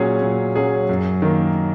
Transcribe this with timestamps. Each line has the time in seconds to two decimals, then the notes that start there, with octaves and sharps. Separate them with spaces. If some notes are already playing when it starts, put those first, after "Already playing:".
Already playing: A#2 F#3 C#4 G#4
0.22 A#2
0.56 F#3 C#4 G#4
0.89 F#2
1.22 D#3 A#3